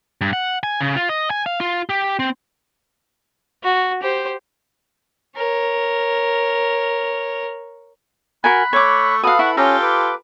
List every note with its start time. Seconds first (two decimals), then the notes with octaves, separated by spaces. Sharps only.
0.21 G2
0.33 F#5
0.63 G#5
0.81 C#3
0.96 F4
1.09 D#5
1.30 G#5
1.46 F5
1.60 F4
1.90 G4
2.19 C4
3.64 F#4
4.02 G4 C5
5.36 A#4 C#5
8.44 F#4 A#4 G#5 B5 F#6
8.73 A3 C#5 C#6 D6
9.23 F#4 A4 B4 F5 D#6
9.39 E4 F#5 C#6
9.57 C#4 F4 G4 A4 A#5
9.82 B4 D6